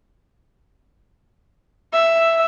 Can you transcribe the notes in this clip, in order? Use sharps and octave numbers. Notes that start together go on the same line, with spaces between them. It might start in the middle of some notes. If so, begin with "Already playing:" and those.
E5